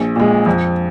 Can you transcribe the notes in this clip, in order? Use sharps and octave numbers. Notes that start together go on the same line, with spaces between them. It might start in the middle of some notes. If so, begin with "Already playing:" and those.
Already playing: A#1
A#2 G#3
F2